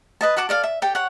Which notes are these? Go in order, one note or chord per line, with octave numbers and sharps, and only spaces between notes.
B4 D#5 A5
F#4 F#5 A5 D6
A4 D5 F5 A5
E5
G4 A4 G5
C#5 F#5